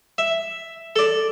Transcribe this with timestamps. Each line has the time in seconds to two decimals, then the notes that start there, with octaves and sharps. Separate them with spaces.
0.18 E5
0.96 A4 D5